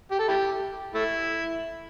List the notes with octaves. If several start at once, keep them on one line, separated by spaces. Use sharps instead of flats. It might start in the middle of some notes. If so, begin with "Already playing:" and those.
G4
A4
E4 G4
A3 E4